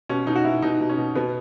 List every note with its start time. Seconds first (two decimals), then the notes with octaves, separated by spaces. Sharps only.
0.09 B2 C#4
0.27 B2 D#4
0.36 F#4
0.44 B2 E4
0.62 B2 D#4
0.81 B2
0.89 C#4
0.98 B2
1.15 B2 B3